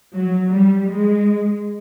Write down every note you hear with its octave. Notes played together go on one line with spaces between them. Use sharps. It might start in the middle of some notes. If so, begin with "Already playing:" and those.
F#3
G3
G#3